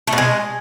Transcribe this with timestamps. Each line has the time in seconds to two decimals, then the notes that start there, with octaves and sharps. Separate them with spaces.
0.07 A3
0.13 B2
0.18 G#3